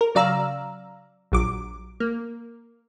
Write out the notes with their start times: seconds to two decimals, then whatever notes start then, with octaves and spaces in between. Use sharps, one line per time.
0.01 A#4
0.15 C#3 F#3 D5 F5 A#5 E6
1.32 A#1 F#3 D6
2.00 A#3